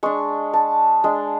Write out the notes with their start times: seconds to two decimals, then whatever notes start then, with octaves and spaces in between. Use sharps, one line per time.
0.03 G#3 D4 C#6
0.54 A5
1.04 G#3 D4